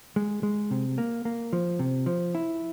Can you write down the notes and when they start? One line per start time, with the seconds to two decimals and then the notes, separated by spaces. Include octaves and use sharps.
0.16 G#3
0.43 G#3
0.71 C3
0.98 A#3
1.25 A#3
1.53 F3
1.79 C3
2.06 F3
2.35 E4